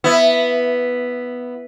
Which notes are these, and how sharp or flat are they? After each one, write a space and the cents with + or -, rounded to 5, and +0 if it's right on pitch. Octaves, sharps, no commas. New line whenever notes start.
B3 +0 E4 +5